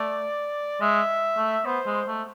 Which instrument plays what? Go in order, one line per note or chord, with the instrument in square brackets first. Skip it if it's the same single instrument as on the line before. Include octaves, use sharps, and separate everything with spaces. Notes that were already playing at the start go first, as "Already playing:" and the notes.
Already playing: [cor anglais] A3 [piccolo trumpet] D5
[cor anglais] G#3 [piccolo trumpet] E5
[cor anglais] A3
[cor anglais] B3 [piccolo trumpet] C5
[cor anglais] G#3
A3